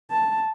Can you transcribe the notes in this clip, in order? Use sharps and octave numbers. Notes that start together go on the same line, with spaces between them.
A5